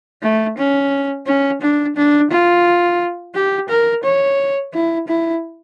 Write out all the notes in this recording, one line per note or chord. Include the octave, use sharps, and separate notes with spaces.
A3
C#4
C#4
D4
D4
F4
G4
A#4
C#5
E4
E4